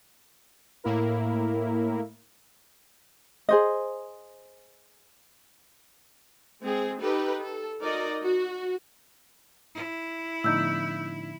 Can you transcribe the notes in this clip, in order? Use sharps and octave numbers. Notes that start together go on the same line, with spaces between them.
A2 A#3 E4 A#4
G#4 C5 D#5
G#3 C4 G#4
D#4 G4 A4 B4
A4
D#4 F#4 A#4 D5 D#5
F#4
E4
A2 D3 F3 B3 D4 D#4 E6 G6